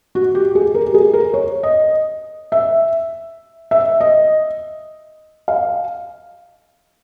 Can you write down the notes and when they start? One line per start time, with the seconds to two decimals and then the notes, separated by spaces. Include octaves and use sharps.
0.15 F#4
0.35 G4
0.55 G#4
0.75 A#4
0.86 G4
0.94 G#4
1.14 A#4
1.34 C#5
1.63 D#5
2.52 E5
3.71 E5
4.00 D#5
5.48 F5